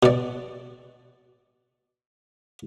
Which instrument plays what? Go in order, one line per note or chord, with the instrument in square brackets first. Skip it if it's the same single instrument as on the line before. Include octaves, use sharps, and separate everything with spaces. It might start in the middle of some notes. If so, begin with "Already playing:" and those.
[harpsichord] B2 D5